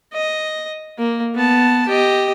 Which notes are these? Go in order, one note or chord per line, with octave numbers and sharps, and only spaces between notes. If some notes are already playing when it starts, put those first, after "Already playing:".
D#5
A#3
B3 A5
G4 D#5